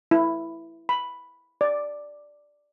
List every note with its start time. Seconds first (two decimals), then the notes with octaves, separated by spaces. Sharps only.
0.11 E4
0.89 B5
1.61 D5